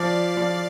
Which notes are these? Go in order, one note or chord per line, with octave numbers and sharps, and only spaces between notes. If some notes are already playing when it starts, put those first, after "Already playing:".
Already playing: F3 D5 F5
F3